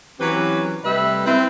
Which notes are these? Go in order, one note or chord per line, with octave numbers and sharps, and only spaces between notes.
E3 F#3 C4 C#4 G4 B4
C3 G3 A3 B4 D#5 E5
C4 E4 B4